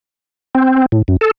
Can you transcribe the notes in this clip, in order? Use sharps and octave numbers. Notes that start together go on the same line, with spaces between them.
C4
A2
F#2
A4